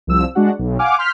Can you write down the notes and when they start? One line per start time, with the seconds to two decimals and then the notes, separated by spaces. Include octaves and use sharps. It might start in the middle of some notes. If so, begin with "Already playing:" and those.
0.07 C2 F3 E6
0.35 G#3 D4 F#4 F#5
0.59 B1
0.79 F5 F#5 G#5 D6 F6
0.98 C6 F6 G6 B6